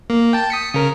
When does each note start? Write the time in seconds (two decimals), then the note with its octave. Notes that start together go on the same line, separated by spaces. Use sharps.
0.10 A#3
0.33 G5 A5
0.50 D#6 B6 C#7
0.74 C#3 A#4